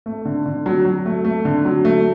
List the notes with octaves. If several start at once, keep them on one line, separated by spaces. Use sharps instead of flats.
A3
D3
D3
F#3
F#3
A3
A3
D3
F#3
A3